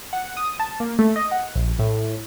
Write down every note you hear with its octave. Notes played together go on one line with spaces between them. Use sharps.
F#5
D#6
A5
A#3
A3
D#5
F#5
A#1
A2